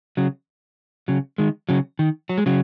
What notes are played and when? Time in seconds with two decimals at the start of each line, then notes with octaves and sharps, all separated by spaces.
0.17 C#3 F#3
1.08 C#3 F#3
1.38 D#3 G#3
1.69 C#3 F#3
1.99 D#3
2.29 F#3
2.38 G#3
2.46 C#3 F#3